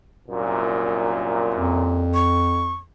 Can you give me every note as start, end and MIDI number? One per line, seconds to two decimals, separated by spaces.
0.28 2.17 36
0.28 2.17 42
0.28 2.17 46
1.55 2.83 41
2.14 2.73 85